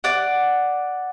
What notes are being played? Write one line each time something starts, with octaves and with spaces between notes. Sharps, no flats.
D5 F#5